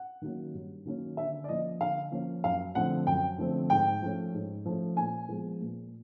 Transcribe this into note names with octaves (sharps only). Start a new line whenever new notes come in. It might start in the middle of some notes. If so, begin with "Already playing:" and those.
Already playing: F#5
D#3 F#3 A#3 C#4
G2
D#3 F#3 A#3 C#4
D3 E5
D5
F3 A#3 C#4 D#5
D3 F5
F3 A#3 C#4
F#2 F5
D3 F3 A3 C4 F#5
F#2 G5
D3 F3 A3 C4
G#2 G5
F3 A3 C#4
G#2
F3 A3 C#4
A#2 G#5
F3 G#3 B3
A#2